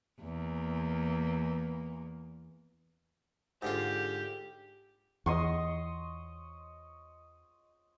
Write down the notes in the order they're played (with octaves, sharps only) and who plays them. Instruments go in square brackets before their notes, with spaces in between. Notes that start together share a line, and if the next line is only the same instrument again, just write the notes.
[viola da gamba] E2 A#3
[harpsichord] G#2 D3 F4 [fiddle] G4
[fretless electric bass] E2 [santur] D#5 C6 C#6